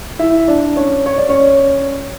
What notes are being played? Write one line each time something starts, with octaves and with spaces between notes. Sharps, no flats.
E4 E5
D4 D5
C#4 C#5
C#5
D5
C#4 C#5